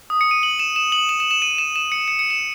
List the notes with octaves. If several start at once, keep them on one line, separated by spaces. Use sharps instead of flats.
D#6
C#7
D#7
F#7
E7
E7
F#7
E7
E7
E7
D#7
E7
E7
C#7
C#7
C#7
E7